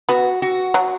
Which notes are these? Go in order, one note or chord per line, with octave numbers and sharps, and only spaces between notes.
B3 F#4
F#4
F#3